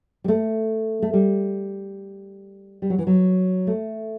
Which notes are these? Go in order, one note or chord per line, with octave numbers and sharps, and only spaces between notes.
G3
A3
A3
G3
G3
F#3
E3
F#3
A3